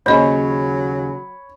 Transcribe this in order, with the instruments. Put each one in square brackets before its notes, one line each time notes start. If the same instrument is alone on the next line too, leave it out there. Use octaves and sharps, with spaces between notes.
[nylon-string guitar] D#2 C#3 G#5 [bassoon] F#3 [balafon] C5 D#5 [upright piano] C#5 B5